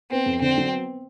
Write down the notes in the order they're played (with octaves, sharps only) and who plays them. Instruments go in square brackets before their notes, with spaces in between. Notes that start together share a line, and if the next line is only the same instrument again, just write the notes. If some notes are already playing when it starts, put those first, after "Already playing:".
[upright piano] B3 [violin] C4
[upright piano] F2
[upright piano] D3 [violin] C4
[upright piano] F#3
B3